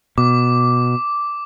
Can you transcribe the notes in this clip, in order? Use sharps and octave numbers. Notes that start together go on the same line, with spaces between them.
B2 D6